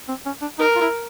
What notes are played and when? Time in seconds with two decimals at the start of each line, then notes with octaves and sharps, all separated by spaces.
0.08 C4
0.26 C#4
0.42 D4
0.59 D#4 A#4
0.76 F4
0.81 E4